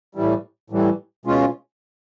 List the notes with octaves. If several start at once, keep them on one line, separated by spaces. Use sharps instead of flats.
A2 E3 G3
A2 E3 G3
B2 G#3 C#4 F4